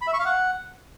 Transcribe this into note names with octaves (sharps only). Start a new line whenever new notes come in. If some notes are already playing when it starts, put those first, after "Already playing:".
B5
E5
C#6
F5
F#5